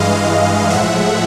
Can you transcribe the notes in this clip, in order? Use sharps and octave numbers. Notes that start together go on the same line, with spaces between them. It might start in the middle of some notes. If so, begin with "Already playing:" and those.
Already playing: G2 E3 G#3 D#5 F5
A2 F3 G#3 E5 F#5